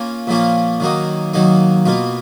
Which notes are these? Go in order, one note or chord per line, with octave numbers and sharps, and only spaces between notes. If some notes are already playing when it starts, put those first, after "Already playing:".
Already playing: A#3 C#4 F4
A#2 F3 A#3 C#4 F4
D#3 F#3 A#3 D#4
D#3 F#3 A#3 D#4
B2 A#3 F4